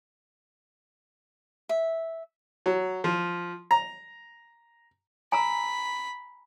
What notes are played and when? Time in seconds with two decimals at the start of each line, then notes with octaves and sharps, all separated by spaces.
1.69 E5
2.66 F#3
3.04 F3
3.71 A#5
5.32 G#5 A#5 B5 E6